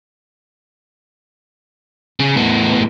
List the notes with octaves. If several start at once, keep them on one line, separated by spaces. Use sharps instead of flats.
C#3
A2 B3